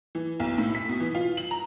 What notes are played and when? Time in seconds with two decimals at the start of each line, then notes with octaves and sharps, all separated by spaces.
0.15 E3
0.40 B1
0.58 A2
0.75 B6
0.89 B2
1.00 E3
1.15 F4
1.37 F#7
1.51 A#5